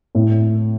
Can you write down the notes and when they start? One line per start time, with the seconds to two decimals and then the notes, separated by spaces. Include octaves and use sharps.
0.15 A2